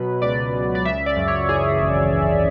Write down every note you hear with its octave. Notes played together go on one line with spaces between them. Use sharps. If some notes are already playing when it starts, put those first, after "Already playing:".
Already playing: B2 F#3 B4
C#2 D5
C#2
D5
C#3 E5
D5
F#2
C#5
E3 G#4
G#1